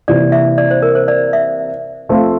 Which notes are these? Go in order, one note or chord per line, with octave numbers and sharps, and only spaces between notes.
C3 E3 A#3 E4 D5
E5
D5
C5
A#4
C5
D5
E5
F3 A3 C4 F4 A4